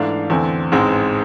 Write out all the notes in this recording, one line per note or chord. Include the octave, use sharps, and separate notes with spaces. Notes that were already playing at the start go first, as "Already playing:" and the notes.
Already playing: G#2 E3 A3 D4 F5
E2 D3 A3 C4 G#5
A1 G#2 G#3 C4